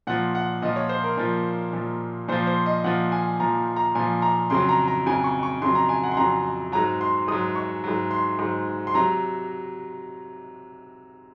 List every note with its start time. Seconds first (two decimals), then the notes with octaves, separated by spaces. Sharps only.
0.07 A#2 F3 F#5
0.35 F#5
0.62 A#2 F3 D#5
0.76 C#5
0.89 C5
1.04 A#4
1.17 A#2 F3
1.73 A#2 F3
2.28 A#2 F3 C5
2.47 C5
2.66 D#5
2.84 A#2 F3 F#5
3.12 G#5
3.40 A#2 F3 A#5
3.76 A#5
3.95 A#2 F3 G#5
4.22 A#5
4.50 F2 C#3 F#3 C6
4.69 A#5
4.88 A#5
5.06 F2 C#3 F#3 G#5
5.24 C#6
5.43 C#6
5.62 F2 C#3 F#3 C6
5.75 A#5
5.89 G#5
6.03 F#5
6.11 C6
6.17 F2 C#3 F#3 A#5
6.72 G#2 F#3 A#5
7.01 C6
7.28 G#2 F#3 D#6
7.56 C#6
7.84 G#2 F#3
8.11 C6
8.39 G#2 F#3
8.87 C6
8.94 C3 F#3 A#5